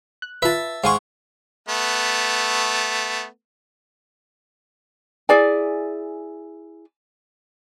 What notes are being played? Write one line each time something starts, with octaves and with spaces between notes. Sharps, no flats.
F#6
F4 B4 E5 A5
G#2 F5 F#5 G#5 C6 C#6
A3 B3
E4 G#4 D5 G#5